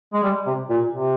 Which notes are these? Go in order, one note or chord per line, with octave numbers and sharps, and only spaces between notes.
G#3
G3
C3
A#2
C3